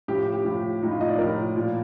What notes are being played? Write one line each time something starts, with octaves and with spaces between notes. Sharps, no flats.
A2 F3 G4
G4
A2 F3
A2 F3 D#4
F4
D#5
D5
A2 F3 A#4
A#2 F3